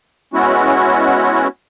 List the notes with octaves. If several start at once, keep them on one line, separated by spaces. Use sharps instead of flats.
G#3 B3 C#4 E4 F#4